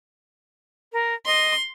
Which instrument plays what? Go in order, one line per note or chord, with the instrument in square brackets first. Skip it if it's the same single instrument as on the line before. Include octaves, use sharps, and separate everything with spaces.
[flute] A#4
[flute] D#5 [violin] C6